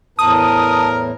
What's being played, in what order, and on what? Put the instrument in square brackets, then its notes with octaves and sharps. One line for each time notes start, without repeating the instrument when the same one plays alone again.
[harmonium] E2 A2 [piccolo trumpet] A#4 [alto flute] A5 [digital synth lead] D#6